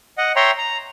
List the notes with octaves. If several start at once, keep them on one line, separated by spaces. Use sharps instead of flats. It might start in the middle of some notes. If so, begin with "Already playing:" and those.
D#5 F#5
C#5 E5 G5 A#5 C6
A#5